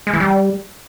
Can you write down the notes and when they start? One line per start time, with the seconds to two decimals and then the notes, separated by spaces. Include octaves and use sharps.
0.07 G#3
0.13 E3
0.20 G3